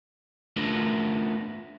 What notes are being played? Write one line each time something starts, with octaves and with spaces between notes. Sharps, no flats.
A3 B3 D4 F4 A#4